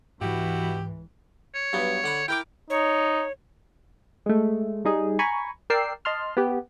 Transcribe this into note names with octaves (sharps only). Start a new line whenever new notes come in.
C#2 G#2 B2 E3 E4 F#4 G4
C#5
G2 F#3 B3
D3 F#5 B5
E4 A#4 G5 D6
D#4 C#5
G#3 A3
G3 D#4 G#4
G#5 A#5 B5 C#6
A#4 D5 G5 E6 C7
D#5 A5 C6 F6
B3 G4